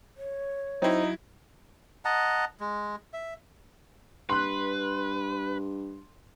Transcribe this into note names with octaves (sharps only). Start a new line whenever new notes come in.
C#5
F#3 C4 D#4 E4 C5
D#5 F#5 A5 A#5
G#3
E5
G2 B4 C6 F#6